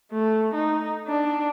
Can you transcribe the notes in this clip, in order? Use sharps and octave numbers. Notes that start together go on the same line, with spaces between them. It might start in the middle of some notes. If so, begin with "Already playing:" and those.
A3
D#4
D4